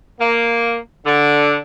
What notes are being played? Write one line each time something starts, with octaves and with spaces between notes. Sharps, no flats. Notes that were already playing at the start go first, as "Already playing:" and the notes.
A#3
D3